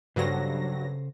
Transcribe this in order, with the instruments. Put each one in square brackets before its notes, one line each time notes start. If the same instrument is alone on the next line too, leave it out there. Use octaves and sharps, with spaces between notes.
[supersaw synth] G2 F#3 A#6 [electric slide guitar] C#3 A4 C5